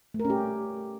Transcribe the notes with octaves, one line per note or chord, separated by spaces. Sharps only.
A3
A#4
C#4
G4